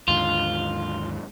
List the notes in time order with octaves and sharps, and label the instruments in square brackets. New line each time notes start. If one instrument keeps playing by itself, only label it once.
[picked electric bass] D#2 G#2 D3 [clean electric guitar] F4